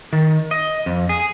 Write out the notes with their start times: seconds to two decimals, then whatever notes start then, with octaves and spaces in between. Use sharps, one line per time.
0.13 D#3
0.51 D#5
0.86 F2
1.09 G#4